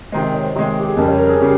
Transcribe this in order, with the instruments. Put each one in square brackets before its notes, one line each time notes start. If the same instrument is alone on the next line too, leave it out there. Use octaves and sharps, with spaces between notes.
[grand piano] C3 D#3 G#3 [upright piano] C5
[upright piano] D#5
C#5
C5
[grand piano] C3 D#3 G#3
[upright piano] G4
G#4
[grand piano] F2 C#3 G3 [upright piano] A#4
[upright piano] C#5
A#4
G#4
[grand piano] C#3 G3 [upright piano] G4